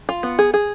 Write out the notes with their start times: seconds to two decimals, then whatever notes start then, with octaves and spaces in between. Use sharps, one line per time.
0.09 F4
0.23 B3
0.39 G#4
0.54 G#4